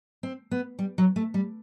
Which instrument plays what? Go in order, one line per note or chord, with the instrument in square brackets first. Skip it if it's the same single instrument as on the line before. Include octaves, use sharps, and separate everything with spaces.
[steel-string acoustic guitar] C4
B3
G3
F#3
A3
G3